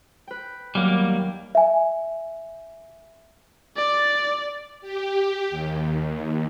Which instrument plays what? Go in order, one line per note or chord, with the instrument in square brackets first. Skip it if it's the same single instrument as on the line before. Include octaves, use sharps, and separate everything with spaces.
[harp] B4 G5
[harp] D#2 F#3 B3 [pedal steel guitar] G3 A#3
[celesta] E5 G#5
[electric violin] D5
[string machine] G4
D#2